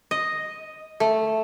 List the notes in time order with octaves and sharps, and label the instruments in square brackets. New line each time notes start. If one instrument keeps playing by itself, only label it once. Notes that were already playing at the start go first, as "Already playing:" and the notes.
[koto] D#5
A3